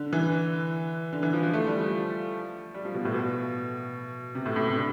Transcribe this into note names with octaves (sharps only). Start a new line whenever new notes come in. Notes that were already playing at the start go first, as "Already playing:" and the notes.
Already playing: D3
E3
D3
E3
F3
F3
A3
G3
F3
G3
F3
B2
A2
B2
C3
A2
A2
C3
D3